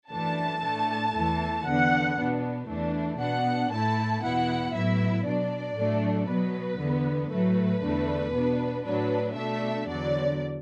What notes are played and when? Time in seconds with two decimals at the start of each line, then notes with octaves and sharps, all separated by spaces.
0.11 F#2 E3 A3 D4 A5
0.63 A2 A3 D4
1.15 E2 E3 A3 E4
1.65 E2 D3 B3 D4 F#5
2.18 B2 B3 D4
2.68 E2 E3 A3 D4
3.19 B2 B3 D4 F#5
3.72 A2 A3 E4 A5
4.22 E2 B2 B3 E4 F#5
4.74 A2 F#3 B3 E4 E5
5.24 B2 F#3 D4 D5
5.76 A2 F#3 A3 D4
6.27 B2 F#3 B3 B4
6.80 E2 D3 B3
7.30 A2 F#3 A3 B4
7.82 E2 D3 A3 D4
8.33 B2 B3 D4
8.85 A2 F#3 D4 B4
9.35 B2 A3 D4 E5
9.87 E2 D3 F#3 D5